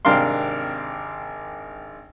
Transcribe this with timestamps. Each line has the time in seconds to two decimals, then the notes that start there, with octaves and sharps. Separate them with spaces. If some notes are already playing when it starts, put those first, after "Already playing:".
0.05 G#1 C3 D4 A#4 F5 C6